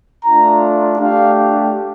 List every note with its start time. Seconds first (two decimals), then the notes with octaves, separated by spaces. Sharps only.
0.25 A3 D4 F4 A#5
0.99 A3 D4 G4 F5